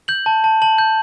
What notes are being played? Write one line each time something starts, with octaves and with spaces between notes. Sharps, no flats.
G6 F#7
A5
A5
A5 F#7
G6